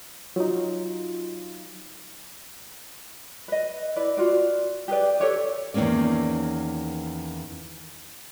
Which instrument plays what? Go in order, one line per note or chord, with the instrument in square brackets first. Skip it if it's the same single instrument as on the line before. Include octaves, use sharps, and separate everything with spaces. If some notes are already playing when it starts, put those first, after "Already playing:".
[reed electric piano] F#3 D#4 [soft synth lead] F4
[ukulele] B4 D#5
E4 B4 D5
F4 F#4 D5
G4 G#4 B4 D5
G4 A4 C#5 D5
[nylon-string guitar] E2 D#3 A#3 C#4 D5